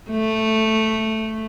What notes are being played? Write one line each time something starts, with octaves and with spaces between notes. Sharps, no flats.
A3